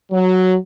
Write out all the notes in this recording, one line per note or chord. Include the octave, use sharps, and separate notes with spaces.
F#3